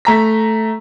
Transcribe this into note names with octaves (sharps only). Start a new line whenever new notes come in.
A3 A#5 B6